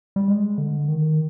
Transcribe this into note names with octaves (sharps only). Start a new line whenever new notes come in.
G3
G#3
D3
D#3